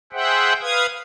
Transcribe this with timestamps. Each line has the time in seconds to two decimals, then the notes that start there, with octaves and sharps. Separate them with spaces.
0.13 G#4 C5 E5 F#5 G5
0.61 B4 F5 D#6 G#6